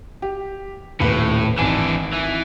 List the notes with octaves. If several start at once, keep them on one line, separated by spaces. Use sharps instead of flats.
G4
D#1 A2 B4
G#1 E3 D4 G#5 E7
E3